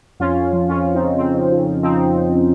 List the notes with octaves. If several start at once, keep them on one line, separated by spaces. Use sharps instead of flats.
F2 C#4 F4
F2
F3
F2 C#4 F4
F2
C4 D#4
C#3
F2 C4
F2
F3
F3
F3 C4 D#4